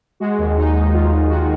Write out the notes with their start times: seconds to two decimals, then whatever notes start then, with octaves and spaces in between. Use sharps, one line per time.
0.20 G#3 F#4
0.39 D#2
0.56 G#3 D#4
0.75 D#2
0.93 D#2 F4
1.12 G#3
1.30 D#3 F#4